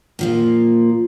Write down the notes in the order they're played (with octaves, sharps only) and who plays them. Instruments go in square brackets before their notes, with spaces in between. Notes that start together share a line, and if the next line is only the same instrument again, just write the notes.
[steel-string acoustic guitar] A#2 F3 A#3